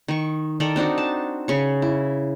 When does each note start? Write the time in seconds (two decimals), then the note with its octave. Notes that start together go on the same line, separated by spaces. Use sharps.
0.08 D#3 C#6
0.60 D#3 A4 A#4 D5
0.76 C4 D4 D#4 F#4
0.98 A5
1.48 C#3 C#6
1.82 E4